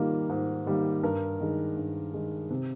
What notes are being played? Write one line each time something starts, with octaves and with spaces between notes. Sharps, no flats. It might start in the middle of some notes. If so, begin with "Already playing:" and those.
Already playing: G#2 D#3 G3 A#3 F4
G#2
D#3 G3 A#3
G2 A#4
D#3 G#3
G2
D#3 G#3
C3